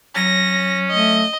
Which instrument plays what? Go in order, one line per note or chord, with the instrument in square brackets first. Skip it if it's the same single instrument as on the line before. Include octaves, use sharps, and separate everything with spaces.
[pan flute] F#3 [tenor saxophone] C#4 [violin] A#6
[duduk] A3 [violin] D#5